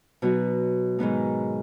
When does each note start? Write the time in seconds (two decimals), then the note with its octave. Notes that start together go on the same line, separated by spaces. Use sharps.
0.22 B2 F#3 B3 D#4 F#4
0.99 G#2 D#3 F#3 B3 D#4